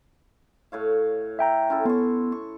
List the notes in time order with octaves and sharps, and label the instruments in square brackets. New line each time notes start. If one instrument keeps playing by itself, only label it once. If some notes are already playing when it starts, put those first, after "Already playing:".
[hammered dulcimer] A2 C#5 F5
[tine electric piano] E5 G5 A#5
[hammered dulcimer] C#4 E4 A4
[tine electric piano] B3 [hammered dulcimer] C6 C#6
[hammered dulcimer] C#6